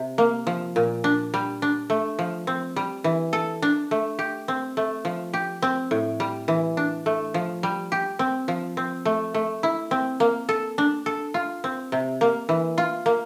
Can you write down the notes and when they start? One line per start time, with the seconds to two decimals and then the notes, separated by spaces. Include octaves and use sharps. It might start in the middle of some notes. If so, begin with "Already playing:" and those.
Already playing: C3
0.18 A#3
0.47 F3
0.76 A#2
1.04 D4
1.34 G3
1.62 D4
1.90 A3
2.19 F3
2.47 C4
2.76 G3
3.04 E3
3.33 A4
3.62 D4
3.91 A3
4.19 G4
4.48 C4
4.77 A3
5.05 F3
5.34 G4
5.62 C4
5.91 A2
6.20 G3
6.48 E3
6.77 D4
7.06 A3
7.34 F3
7.63 G3
7.92 G4
8.19 C4
8.48 F3
8.77 C4
9.05 A3
9.34 A3
9.63 E4
9.91 C4
10.20 A#3
10.49 A4
10.78 D4
11.06 A4
11.34 F4
11.64 C4
11.92 C3
12.21 A#3
12.49 E3
12.78 F4
13.06 A#3